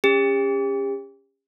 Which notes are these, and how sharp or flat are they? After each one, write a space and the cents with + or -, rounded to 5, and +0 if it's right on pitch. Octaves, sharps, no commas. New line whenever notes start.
C#4 +0 G4 +40